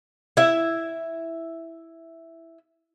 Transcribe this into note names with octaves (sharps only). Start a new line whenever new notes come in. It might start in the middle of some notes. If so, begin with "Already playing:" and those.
E4 E5